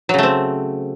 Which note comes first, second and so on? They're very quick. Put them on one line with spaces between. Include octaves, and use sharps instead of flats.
F#3 C#3 A3 C4